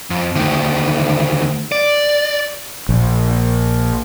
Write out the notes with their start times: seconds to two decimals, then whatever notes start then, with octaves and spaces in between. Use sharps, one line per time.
0.10 F2
0.35 D2 D#3
1.72 D5
2.89 A#1